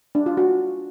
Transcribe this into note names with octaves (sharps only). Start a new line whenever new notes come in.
D4
F4
F#4